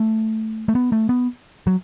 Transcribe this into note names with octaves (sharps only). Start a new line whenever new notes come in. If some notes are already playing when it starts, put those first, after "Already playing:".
Already playing: A3
A3
B3
A3
B3
F#3